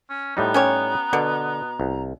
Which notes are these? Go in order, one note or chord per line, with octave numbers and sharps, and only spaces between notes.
C#4
A2 G3 B3 D#4 A#5
C#4 G4 C#5
B2 D3
C2